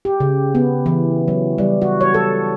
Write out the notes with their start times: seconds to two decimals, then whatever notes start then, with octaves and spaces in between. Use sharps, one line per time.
0.05 G4
0.20 C#3
0.55 B3
0.86 E3
1.28 F#3
1.58 G3
1.82 F#4
2.01 C#5
2.14 A4